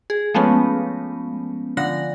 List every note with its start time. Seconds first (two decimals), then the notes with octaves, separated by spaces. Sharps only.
0.10 G#4
0.34 F3 G#3 A3 B3 C#4
1.77 D3 F3 F#5 A#6